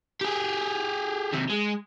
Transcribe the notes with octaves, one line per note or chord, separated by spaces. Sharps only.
G4 G#4
D#2 C3
G#3